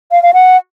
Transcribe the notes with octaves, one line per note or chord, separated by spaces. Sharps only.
F5
F5
F#5